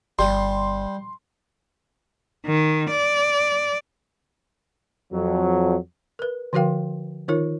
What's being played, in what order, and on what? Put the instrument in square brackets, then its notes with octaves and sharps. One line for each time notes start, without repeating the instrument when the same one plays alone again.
[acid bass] G1 [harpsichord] G3 [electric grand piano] C6
[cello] D#3
D5
[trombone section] F2 F#3
[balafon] A#4 B4
D3 F3 F#4 A#4 F5 G5
D#3 D#4 F4 A#4 C#5